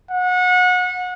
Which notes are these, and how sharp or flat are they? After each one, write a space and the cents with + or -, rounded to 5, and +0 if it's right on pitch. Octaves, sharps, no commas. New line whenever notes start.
F#5 -30